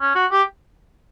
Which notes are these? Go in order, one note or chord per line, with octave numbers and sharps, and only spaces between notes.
C#4
F#4
G4